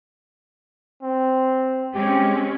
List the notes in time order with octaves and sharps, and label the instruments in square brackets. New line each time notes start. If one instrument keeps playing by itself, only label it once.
[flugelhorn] C4
[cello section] G#3 C4 C#4 [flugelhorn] G4